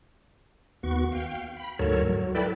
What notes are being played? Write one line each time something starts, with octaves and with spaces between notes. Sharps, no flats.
D#2 B3 F#4 C#6
F5 G5
B5
D2 G#2 F#3 A4 A#4 C#5
F#3
E4 A4 B4 D5 G5